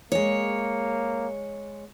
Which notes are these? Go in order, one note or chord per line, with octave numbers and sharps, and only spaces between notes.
G#3 A#3 C#5